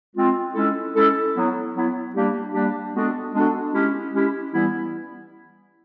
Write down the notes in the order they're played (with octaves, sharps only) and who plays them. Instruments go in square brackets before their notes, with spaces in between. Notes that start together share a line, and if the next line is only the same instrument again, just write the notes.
[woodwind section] G#3 C4 F4
G#3 C#4 E4 A4
G#3 C#4 E4 A4
F#3 B3 E4
F#3 B3 E4
G3 A#3 D4 G4
G3 A#3 D4 G4
G#3 B3 D4 F#4 A4
G#3 B3 D4 F#4 A4
G#3 C#4 E4 G4
G#3 C#4 E4 G4
E3 G3 B3 E4